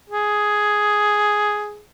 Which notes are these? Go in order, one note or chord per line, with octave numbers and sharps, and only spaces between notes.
G#4